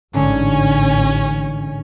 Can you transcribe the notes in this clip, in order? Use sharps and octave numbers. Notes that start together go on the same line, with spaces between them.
A1 G#2 D3 G#3 C#4